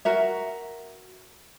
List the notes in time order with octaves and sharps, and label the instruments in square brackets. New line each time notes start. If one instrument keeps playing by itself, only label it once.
[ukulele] F#4 A#4 E5